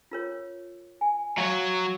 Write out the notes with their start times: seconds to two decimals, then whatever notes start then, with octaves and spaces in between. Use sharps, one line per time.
0.11 F4 A#4 C#5
1.01 G#5
1.38 F#3 C#5 F5